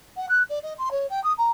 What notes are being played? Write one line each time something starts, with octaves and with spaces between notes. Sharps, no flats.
F#5
F#6
D5
D#5
C6
C#5
G5
D#6
A#5